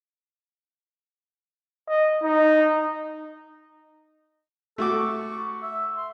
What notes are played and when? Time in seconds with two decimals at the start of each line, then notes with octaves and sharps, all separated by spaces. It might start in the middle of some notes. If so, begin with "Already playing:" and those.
1.88 D#5
2.23 D#4
4.78 A3 F#4 A4 D6
4.97 C#6
5.62 E5
5.97 C6